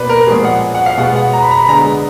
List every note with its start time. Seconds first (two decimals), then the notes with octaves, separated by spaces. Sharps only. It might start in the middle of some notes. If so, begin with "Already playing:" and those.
Already playing: B2 A#3 B4 D5
0.09 A#4
0.27 A#2 F3 G#3 B3 G#4
0.45 F#5
0.75 F#5
0.86 F5
0.97 B2 G#3 B3 F#5
1.16 F#5
1.33 A#5
1.43 B5
1.51 A#5
1.59 B5
1.69 D3 G#3 B3 A#5